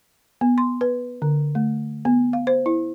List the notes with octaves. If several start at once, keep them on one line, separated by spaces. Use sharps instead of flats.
B3
C6
B4
D3
A3
B3
F5
C5
E4